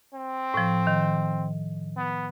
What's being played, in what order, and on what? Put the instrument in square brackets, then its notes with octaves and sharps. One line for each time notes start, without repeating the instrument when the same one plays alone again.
[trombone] C4
[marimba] A2 F3
D#3
[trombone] B3